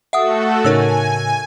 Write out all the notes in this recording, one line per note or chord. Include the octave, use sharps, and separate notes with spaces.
A3 F#4 A4 E5 F#5 D#6
A2 C#3 D#4 A#4 C#5 G#5 E6